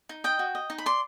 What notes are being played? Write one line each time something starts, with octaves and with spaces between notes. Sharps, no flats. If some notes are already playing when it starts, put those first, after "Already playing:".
D#4
D#5 G5
F#4
D#5
D#4
B5
D5 C6